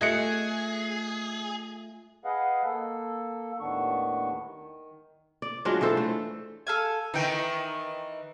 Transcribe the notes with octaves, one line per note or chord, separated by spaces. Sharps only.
A3 F4 G#4 D#5 E5 F#6 C#7
G#4 B4 D#5 F5 F#5
A#3 A4
D#2 A2 D#3 B3 D4 C#6
D#3
D5
F#3 G#3 D4 F4
E3 F4 A4 C5
A3
A4 F5 G#5
D#3 E3 D#4 G5